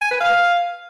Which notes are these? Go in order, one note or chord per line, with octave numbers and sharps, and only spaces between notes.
G#5
B4
F5